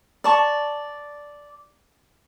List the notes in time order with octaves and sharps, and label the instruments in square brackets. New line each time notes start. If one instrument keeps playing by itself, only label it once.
[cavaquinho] D5 A5 C#6